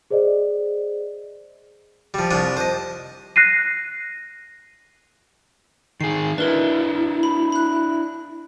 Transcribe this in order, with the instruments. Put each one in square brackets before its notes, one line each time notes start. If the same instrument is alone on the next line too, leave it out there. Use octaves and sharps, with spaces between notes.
[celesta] G#4 C5 D5 D#5
[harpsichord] F3 G3
C2 F3 D4 D#6
C5 D#5
[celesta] F#6 A#6 C7 D#7
[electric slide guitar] D#3 G#4 [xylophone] C7
[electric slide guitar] D4 E4 [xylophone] A#4 B4
[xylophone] B5
B5 F#6